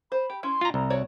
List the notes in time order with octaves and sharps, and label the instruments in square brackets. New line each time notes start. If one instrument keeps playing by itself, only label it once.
[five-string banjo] C5 [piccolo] B5
[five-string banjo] G4
[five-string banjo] C#4 E4 [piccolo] C6
[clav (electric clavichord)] F4 A#5
[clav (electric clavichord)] C2 [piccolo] A#5
[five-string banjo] F#4 C#5 D5